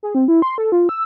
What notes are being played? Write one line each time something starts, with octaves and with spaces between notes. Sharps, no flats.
G#4
C4
E4
C6
A4
F4
E6